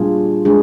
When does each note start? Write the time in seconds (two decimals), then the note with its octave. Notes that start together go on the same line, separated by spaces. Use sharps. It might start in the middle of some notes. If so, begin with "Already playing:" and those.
Already playing: A#2 G3 D4 F4 G#4
0.45 G#3 D4 G#4